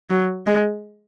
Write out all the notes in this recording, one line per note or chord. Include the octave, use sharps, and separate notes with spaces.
F#3
G#3